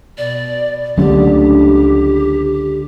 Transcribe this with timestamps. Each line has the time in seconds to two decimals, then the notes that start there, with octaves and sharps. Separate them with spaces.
0.18 B2 D5
0.97 C#2 D3 F#3 A3 C#4 G4